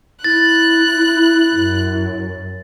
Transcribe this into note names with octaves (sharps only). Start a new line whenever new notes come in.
E4 F#6 A6
F#2